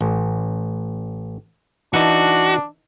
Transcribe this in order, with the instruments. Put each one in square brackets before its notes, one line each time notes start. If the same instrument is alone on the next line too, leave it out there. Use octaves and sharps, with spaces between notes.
[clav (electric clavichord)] A1
[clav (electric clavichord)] E3 D#4 A5 [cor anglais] D4 [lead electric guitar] F#4